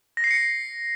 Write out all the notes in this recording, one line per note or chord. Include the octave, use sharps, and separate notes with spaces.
A#6
C7
C#7